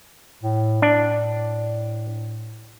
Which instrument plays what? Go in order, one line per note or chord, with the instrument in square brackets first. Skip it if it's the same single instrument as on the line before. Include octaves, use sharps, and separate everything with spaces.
[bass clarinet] A2
[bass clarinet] A2 [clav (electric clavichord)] D4